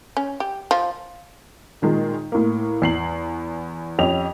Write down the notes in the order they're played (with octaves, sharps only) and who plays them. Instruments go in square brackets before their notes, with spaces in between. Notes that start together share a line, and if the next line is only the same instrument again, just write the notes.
[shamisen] C#4
G4
F3
[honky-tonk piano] A#2 D#3 G#3
A2 A#3
E2 C7 F#7
F2 C#4 G4 D#5 F7